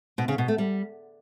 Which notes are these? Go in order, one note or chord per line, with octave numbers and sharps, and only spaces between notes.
B2
C#3
B2
A3
G3